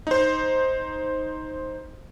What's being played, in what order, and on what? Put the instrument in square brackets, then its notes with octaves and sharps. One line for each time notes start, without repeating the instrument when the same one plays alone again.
[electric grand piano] D#4 C5